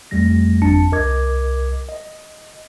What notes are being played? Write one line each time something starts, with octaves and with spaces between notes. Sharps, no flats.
F2 G3 A3 A#6
G1 F2 D4 A5 C#7
C2 A#4 D#5 D6 G#6
D#5